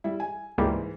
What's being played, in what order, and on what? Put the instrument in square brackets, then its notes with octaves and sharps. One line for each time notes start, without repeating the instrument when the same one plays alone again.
[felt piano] G3 E4
G#5
[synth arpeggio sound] C#2 G3 A#3 [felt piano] G#2 E3 G#3